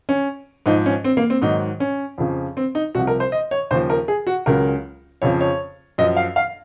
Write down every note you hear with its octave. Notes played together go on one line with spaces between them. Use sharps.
C#4
G#2 F3 D#4
C#4
C4
A#3
C4
G#2 D#3 F#3 D#4
C#4
F2 C#3 F3
C4
D#4
C2 C3 F3 F#4
A#4
C5
D#5
C#5
D#2 C#3 F3 C5
A#4
G#4
F#4
C#2 C#3 F#3 A#4
F2 C#3 F3 C#5
C#5
F#2 F3 D#5
F5
F5